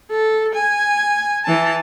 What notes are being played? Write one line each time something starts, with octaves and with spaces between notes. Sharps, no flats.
A4
G#5
E3 A5